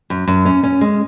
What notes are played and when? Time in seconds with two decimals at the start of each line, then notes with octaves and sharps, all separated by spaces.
0.10 F#2
0.27 F#2
0.45 C#4
0.63 C#4
0.81 G#3